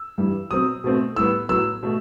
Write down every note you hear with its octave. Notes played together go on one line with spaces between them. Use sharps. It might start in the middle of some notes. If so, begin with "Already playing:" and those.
Already playing: E6
G2 E3 G3
B2 F#3 C4 D#6
B2 A3 C4
A2 G3 B3 E6
A2 F#3 B3 E6
B2 A3